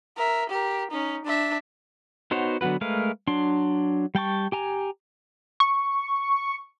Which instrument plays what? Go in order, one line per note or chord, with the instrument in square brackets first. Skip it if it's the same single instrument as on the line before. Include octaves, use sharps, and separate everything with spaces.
[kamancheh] A#4 E5
G4 A#4
C#4 D#4
D4 E5
[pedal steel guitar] B3 D#4 F#4 C5 C#5
D3 F#3 B3 F#4 B4
G#3 A3 A#4 B4 F5
F#3 D4 C6
G3 G5 A5 C#6
G4 G#5 A#5
[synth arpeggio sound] C#6